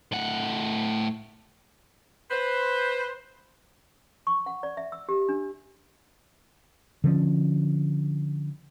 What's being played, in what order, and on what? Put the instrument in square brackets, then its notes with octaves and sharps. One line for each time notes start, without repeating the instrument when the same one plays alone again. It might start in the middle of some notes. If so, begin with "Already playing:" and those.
[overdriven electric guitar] A2 F#5
[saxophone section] B4 C5
[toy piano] C#6
F#5
D5
E5
E6
G4
D4
[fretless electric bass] D3 F3 C#4